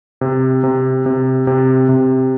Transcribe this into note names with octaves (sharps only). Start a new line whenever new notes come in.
C3
C3
C3
C3
C3